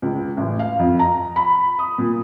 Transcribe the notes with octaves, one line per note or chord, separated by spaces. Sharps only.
C#2
A1
F5
F2
A#5
B5
D#6
A#2